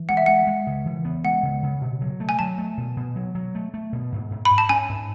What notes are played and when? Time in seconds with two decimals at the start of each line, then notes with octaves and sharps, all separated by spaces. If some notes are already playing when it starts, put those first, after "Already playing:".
Already playing: E3
0.09 G#3 F#5
0.17 E5
0.26 G#3 F#5
0.47 G#3
0.67 C#3
0.85 E3
1.05 B3
1.24 G#3 F#5
1.43 C#3
1.63 C#3
1.81 B2
2.01 F#3
2.20 A3
2.29 G#5
2.39 F#3 A5
2.58 A3
2.78 B2
2.97 B2
3.16 F#3
3.35 F#3
3.55 A3
3.74 A3
3.93 B2
4.12 G#2
4.31 G#2
4.45 B5
4.51 G#2
4.58 A5
4.69 C#4 G#5
4.89 G#2